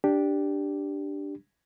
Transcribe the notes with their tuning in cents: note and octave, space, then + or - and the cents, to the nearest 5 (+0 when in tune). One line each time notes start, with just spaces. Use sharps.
D4 +0 G4 +0